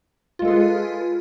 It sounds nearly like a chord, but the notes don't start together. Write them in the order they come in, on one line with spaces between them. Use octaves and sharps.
F4 G#3 A4 G#4 B4